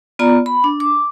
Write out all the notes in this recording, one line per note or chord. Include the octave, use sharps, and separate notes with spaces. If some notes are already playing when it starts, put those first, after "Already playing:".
B3 F4 D5 A#5
B5
D4
D6